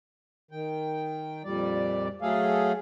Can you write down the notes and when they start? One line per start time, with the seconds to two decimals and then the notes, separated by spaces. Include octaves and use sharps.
0.51 D#3 G5
1.44 F2 A#2 G3 D5
2.21 F#3 A3 G#4 A4 F5